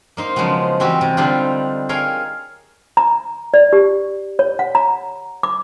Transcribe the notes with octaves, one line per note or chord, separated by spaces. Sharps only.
A#3 D#4 C5
C#3 F3 F#3 G#3 B3
E3 G3 C4 F#4 G4
C3
D3 G3 C4 D4 D#4 F4
G#4 A#4 C#5 F5 G5
A#5
D5
G4
C#5
F#5
A#5
D6